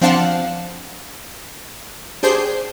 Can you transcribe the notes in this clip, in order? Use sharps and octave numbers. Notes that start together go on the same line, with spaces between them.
F3 C4 D4 F5 F#5 A5
D4 G4 G#4 C5 G6 C7